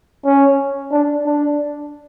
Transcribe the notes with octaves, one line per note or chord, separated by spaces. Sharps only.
C#4
D4
D4